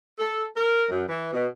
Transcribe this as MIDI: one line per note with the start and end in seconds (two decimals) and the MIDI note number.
0.19 0.45 69
0.57 0.85 70
0.90 1.03 42
1.09 1.32 52
1.33 1.46 47